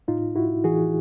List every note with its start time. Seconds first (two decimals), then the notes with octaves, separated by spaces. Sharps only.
0.08 A2 D#4 F4
0.35 A2 E4 F#4
0.64 E3 F#4 G#4